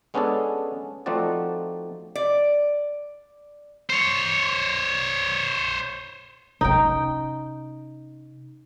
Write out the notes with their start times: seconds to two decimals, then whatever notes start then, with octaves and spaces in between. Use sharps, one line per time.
0.14 G#3 B3 C#4 D4 G#4 A4
1.06 F3 A3 C4 D#4 F#4 D5
2.15 D5
3.90 C5 C#5
6.61 C3 C#4 D#4 G5